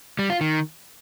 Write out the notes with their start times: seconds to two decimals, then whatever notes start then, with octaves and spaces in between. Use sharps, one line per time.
0.19 G3
0.30 F4
0.41 D#3